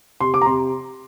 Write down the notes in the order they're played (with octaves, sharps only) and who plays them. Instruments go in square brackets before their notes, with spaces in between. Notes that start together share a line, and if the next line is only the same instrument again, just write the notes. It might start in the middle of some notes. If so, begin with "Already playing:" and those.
[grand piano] C3 C6
D6
A#5
C3 C6